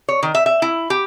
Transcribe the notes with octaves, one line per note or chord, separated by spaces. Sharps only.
C#5
D#3
E5
E5
E4
G4